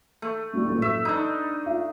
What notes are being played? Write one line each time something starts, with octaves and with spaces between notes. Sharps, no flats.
A3
G2 F#3 G3
A1 A#2
A#2 F#3 E5
D4 D#4 B5
F4 E5 F5